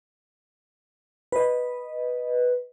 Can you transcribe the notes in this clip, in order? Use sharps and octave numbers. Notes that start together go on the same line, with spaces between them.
B4 D#5